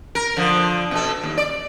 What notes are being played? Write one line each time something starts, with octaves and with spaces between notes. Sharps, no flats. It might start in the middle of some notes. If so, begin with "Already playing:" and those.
A#4
D3 F3
B2 A4
D#2
D5